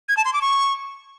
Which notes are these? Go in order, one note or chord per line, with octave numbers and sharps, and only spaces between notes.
G#6
A5
C6
D6
C#6